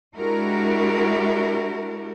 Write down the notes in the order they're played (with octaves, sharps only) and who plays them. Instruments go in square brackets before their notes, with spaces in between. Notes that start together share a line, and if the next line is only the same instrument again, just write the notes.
[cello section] G#3 D4 E4 F#4 G4 A#4